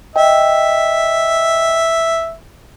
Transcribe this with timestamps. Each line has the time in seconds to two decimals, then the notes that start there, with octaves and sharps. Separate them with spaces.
0.16 D#5 E5 G5